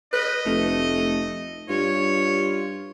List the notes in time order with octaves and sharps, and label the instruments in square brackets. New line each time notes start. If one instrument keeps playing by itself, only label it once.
[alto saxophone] B4 [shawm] D#5
[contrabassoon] F1 [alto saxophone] A3
[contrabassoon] G2 [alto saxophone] F4 [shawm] C#5